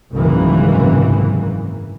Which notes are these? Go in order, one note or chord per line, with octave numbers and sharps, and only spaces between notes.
F#1 C2 G#2 D#3 E3 A#3